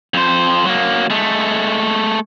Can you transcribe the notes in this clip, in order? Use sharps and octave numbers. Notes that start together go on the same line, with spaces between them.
F2 C5
F#3 A#3
G#3 A3